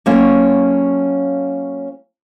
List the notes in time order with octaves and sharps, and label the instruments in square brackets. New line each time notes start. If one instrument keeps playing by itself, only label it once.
[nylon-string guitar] F#3 A#3 C#4 F4 A4 C#5